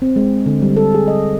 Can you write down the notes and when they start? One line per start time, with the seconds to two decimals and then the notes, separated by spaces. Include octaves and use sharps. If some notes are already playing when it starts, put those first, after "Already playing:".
0.02 C4
0.16 G#3
0.46 D3
0.62 G3
0.77 A4
0.95 G#4
1.08 D#5